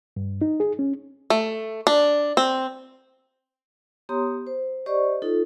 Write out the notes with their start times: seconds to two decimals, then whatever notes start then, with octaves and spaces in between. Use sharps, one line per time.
0.17 G2
0.42 D#4
0.60 G#4
0.79 C#4
1.30 A3
1.87 D4
2.37 C4
4.09 B3 G4 C#5 A#5 C6 D#6
4.47 C5
4.86 G4 C5 D5 D#5 C#6
5.22 D#4 F4 A4